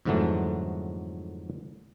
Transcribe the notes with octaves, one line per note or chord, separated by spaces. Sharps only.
F2 G#2 D3 E3 F#3 A3